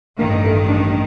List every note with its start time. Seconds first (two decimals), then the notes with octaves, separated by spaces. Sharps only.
0.19 A1 G2 D#3 A#3
0.44 A3
0.69 D4